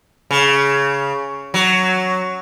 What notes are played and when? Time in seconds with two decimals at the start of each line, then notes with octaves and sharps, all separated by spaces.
0.31 C#3
1.54 F#3